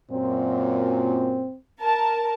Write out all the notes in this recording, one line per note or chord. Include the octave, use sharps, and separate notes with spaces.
F#2 A#2 C4
A#4 A5